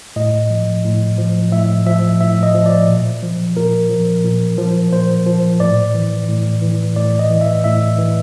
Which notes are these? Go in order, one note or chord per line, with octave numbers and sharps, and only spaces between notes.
A2 D#5
F3
A2
F3
A2 E5
F3 E5
A2 E5
D#5
F3
D5
A#2
F3
A#2 A#4
F3
A#2
F3
A#2 C5
F3
A2 D5
E3
A2
E3
A2 D5
D#5
E3
E5
A2 E5
E3